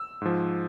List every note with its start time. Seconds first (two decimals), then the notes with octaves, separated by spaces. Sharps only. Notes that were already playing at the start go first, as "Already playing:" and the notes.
Already playing: E6
0.21 G#2 F3